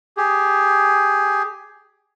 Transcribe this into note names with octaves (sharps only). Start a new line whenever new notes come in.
G4 G#4